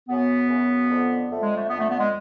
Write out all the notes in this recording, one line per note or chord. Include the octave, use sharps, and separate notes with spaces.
F#2 C#3 B3
F#2 C#3
F2 D3
F2 D3 A3
G#3
A3
F2 D3 B3
A3
B3
G#3